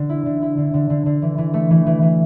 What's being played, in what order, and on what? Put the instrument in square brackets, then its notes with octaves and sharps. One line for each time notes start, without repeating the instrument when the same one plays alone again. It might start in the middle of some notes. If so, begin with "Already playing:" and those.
Already playing: [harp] D3
E4
D3
E4
D3
D3
D3
D3
E3
E3
A3
E3
E3
E3